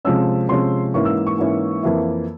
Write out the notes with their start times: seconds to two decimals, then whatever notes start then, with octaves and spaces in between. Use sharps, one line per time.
0.05 C3 F3 G#3 C#4 E6
0.49 C3 F3 G#3 C#4 C6
0.94 G#2 E3 A#3 C#4 E4 C#6
1.05 E6
1.27 C#6
1.38 G#2 E3 A#3 C#4 E4
1.83 F2 E3 A#3 E4